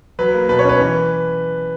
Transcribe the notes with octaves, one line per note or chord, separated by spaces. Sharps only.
F#3 B4
A#3
B2 B4
C#5
C#4
B4
E3